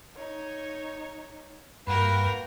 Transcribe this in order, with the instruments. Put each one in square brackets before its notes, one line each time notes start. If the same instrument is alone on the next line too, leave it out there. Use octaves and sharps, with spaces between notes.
[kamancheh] D#4 C#5
[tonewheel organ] G2 [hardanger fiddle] A#3 A#4 [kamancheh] F#4 G5 [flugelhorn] B4